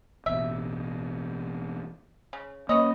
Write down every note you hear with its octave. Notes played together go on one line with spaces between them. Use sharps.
A1 B2 E5
C#3
A#3 C#4 B4 C#5 D#5